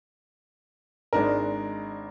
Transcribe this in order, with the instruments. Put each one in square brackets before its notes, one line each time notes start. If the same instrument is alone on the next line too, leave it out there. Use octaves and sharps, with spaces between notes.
[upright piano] G#1 G#3 D4 D#4 A#4